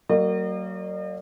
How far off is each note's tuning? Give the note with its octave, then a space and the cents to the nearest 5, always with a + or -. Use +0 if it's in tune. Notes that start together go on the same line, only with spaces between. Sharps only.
F#3 +20 A#3 -30 D#5 -45